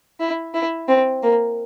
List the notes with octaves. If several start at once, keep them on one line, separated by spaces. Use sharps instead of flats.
E4
E4
C4
A#3